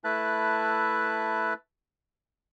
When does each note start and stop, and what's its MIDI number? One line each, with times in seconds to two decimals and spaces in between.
0.04 1.54 57
0.04 1.54 64
0.04 1.54 71
0.04 1.54 76
0.04 1.54 81
0.04 1.54 90